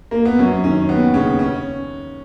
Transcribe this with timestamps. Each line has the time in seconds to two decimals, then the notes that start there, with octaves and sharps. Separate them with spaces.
0.11 A#3
0.25 B3
0.39 F#2 C#4
0.63 D#3 C#4
0.89 D#2 B3
1.14 C#3 C#4
1.39 C#4